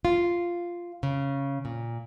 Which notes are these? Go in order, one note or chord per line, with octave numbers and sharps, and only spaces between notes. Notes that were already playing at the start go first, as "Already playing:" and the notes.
F4
C#3
A#2